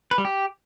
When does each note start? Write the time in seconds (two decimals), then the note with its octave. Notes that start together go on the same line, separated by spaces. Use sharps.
0.11 B4
0.18 G3
0.25 G4